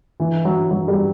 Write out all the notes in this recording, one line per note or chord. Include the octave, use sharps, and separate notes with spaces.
E3
F#3
F#3
G3